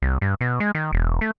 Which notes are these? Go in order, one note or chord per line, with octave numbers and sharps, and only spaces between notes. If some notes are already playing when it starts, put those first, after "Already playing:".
C2
G2
B2
G#3
D#3
E1
A3